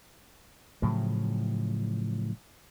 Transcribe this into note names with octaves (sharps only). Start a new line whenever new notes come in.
A2 C#3 F3 F#3